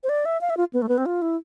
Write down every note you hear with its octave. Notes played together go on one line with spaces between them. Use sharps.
C5
D5
E5
F5
E5
F4
B3
A3
B3
C4
F4
E4